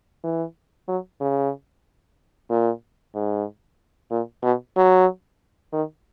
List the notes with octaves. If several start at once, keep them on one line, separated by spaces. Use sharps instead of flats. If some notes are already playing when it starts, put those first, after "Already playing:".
E3
F#3
C#3
A#2
G#2
A#2
B2
F#3
D#3